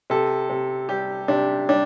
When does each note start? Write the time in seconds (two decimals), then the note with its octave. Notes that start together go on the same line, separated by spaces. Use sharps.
0.10 C3 A4
0.50 C3
0.89 G3 G4
1.28 C3 D4
1.69 G3 D4